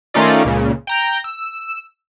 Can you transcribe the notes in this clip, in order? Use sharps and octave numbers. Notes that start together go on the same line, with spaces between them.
D#3 A3 C#4 D#4 F4 D5
C#2 A#2 C#3
G5 A#5 G6
E6